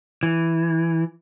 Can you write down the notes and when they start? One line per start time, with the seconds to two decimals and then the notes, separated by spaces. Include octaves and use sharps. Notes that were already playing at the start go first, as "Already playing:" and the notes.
0.23 E3